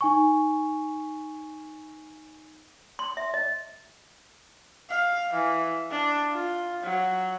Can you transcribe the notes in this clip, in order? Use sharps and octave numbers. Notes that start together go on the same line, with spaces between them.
D#4 G#5 C#6
C6
E5
D#5
F5
E3
D4
F4
F#3